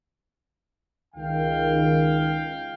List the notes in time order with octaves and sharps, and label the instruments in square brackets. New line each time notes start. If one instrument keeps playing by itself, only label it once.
[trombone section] C#2 D#3 [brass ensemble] F5 G5